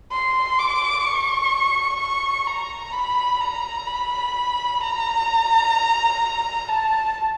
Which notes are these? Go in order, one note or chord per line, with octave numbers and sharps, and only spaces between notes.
C6
D6
C#6
C#6
A#5
B5
A#5
B5
A#5
A5